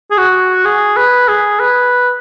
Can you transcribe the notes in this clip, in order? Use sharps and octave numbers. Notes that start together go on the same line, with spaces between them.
G#4
F#4
G#4
B4
G#4
B4